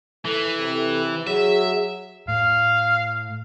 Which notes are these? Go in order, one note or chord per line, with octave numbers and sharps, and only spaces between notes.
E3 A4
C3
F#3 G#4 E5
A2 F5